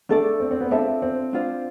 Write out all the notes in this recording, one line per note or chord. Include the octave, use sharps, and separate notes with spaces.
A3 D4 A4 D5
C4
C4
B3
C4 D4 F4 A4 E5
C4
D4 F4 C5